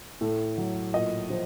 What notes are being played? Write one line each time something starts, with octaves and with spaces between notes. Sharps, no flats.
A2 A4
F#3
A#2 D#5
F3 C5